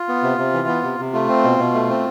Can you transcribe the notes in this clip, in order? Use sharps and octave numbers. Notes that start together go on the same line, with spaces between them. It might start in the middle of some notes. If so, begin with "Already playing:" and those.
Already playing: F4
B3
C3
C3
E3
B3
C3
C3
A3 F4
C4
B2
B2
A3
C4